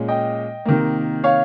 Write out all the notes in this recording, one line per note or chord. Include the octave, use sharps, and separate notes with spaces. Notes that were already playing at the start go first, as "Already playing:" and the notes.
Already playing: A#2 G#3 C#4
D#5 G5
C3 D#3 A#3
C#5 F5